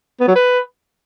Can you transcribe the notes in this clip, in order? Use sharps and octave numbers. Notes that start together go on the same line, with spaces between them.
B3
F#3
B4